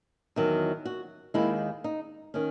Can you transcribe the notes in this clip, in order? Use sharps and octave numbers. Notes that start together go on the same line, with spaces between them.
E2 D#3 F#3
F#4
D#2 D#3 G#3 E4
D#4
D#3 C#4